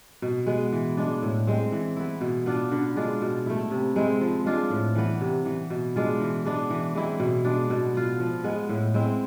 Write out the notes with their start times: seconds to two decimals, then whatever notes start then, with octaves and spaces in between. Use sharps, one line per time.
0.22 B2
0.46 G#3 B3
0.72 E3
0.97 G#3 D4
1.22 A2
1.47 G#3 C4
1.72 E3
1.96 B3 E4
2.21 B2
2.46 B3 D4 F4
2.72 D3
2.96 G#3 D4 F4
3.22 B2
3.46 A3 E4
3.71 C3
3.96 G#3 C4 E4
4.21 F3
4.45 G#3 D4 F4
4.70 A2
4.95 E3 B3
5.21 C3
5.46 E3 B3
5.70 B2
5.96 G#3 D4 F4
6.21 E3
6.45 G#3 B3 D4
6.70 E3
6.95 G#3 C4 E4
7.20 B2
7.44 G#3 B3 D4
7.70 B2
7.94 B3 F4
8.20 F3
8.44 G#3 B3
8.69 A2
8.94 G#3 C4 E4